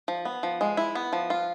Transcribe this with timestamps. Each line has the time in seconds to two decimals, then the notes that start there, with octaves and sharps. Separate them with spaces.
0.08 F3
0.25 B3
0.43 F3
0.61 G#3
0.77 E4
0.95 B3
1.13 F3
1.30 F4